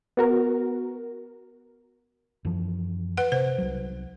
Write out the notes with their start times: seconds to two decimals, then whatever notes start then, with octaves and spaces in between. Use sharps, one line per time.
0.17 B3 F#4 A#4
2.45 F#2 E3 F3
3.17 B4 F#5
3.32 C3 C5
3.58 C2 F#3